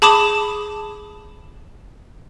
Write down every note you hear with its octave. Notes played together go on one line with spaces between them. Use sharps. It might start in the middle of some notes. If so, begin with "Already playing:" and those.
G#4 A5 B5 D6 D#6 E7